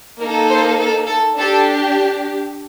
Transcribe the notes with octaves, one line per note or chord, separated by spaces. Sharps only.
A#3 D#4 A4 A#4
C5
A4
A4
D4 G4 A4